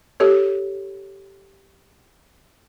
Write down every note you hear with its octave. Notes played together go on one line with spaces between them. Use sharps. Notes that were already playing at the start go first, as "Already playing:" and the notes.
G4 A4 C#5